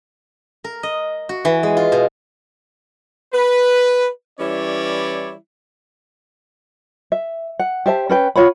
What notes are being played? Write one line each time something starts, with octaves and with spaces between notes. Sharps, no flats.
A#4
D#5
F#4
E3
G#3
F4
B2
B4
E3 G3 C#4 E4 C#5 D5
E5
F#5
G4 C5 E5 A5
C#4 B4 G5
F4 C#5 F#5 B5